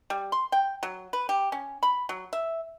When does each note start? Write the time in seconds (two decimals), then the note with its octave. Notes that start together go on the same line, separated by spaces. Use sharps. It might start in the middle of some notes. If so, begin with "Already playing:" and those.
0.10 G3
0.32 C6
0.52 G5
0.83 F#3
1.13 B4
1.29 G4
1.52 C#4
1.83 B5
2.09 F#3
2.33 E5